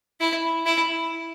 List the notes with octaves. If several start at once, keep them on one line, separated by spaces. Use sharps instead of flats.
E4
E4